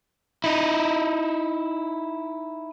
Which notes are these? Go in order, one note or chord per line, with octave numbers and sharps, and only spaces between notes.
D#4 E4